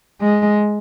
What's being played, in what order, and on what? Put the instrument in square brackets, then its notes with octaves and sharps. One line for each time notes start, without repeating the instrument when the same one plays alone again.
[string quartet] G#3